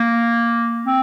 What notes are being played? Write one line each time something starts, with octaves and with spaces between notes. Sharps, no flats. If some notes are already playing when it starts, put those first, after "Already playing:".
Already playing: A#3
C4